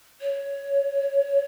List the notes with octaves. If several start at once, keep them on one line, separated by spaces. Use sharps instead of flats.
C#5